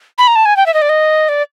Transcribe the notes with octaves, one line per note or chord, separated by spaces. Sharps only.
B5
A#5
A5
G#5
G5
E5
D#5
D5
D#5
D5